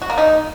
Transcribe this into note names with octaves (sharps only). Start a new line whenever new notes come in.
F#4
A#3
D#4